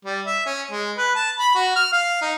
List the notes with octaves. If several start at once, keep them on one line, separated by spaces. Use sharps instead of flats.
G3
E5
C#4
G#3
B4
A5
B5
F#4
F6
F5
D#4